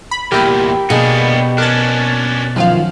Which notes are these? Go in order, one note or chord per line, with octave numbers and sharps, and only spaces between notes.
B5
E2 A#2 E4 G4 A#4 G5 B5
B2 A#3 B3 D4 D#4 G#4
C#4 D4 A#4 A5 F#6 A6
F#2 D#3 F3 F4 F5